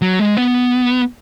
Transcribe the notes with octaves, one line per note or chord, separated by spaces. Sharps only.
F#3
G#3
B3